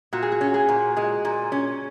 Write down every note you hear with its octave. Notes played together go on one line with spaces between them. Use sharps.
A#2 F#4
G#4
F#4
C#4
G#4
A#2
G#3 G#4
A#2
C#4